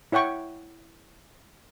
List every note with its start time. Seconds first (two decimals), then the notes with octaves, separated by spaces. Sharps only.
0.12 E4 C#5 F#5 G5 C#6